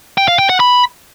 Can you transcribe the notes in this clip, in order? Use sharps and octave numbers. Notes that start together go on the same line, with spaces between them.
G5
F5
G5
F#5
B5